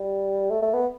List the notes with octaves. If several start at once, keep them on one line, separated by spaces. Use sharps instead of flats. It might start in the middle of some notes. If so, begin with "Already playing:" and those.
Already playing: G3
A3
A3
B3